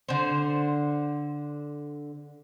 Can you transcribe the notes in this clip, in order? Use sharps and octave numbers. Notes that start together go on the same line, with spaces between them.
D3 C5